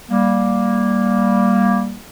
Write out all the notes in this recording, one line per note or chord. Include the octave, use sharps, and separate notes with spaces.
G3 A#3